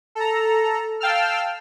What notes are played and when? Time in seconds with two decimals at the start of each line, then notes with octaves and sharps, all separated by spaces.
0.15 A4 A#5
1.00 F5 G5 A5 E6 F6